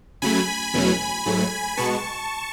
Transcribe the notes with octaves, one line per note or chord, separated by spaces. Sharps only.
C#3 F#3 A3 G#5 B5
E2 B2 F#3 A3 C#4
G#2 F#3 A3
B2 G#3 B3 A5 C#6